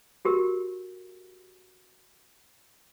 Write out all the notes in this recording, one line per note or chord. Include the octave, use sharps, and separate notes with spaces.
F#4 G4 A#4